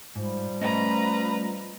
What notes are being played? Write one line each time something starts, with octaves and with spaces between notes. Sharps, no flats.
G#2 F3 G3
A3 C#4 B4 D#5 A#5